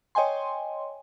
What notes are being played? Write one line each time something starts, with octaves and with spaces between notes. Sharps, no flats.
C#5 D#5 G5 G#5 C6